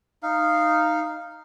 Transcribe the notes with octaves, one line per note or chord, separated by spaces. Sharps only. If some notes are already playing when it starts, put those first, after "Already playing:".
D#4 F5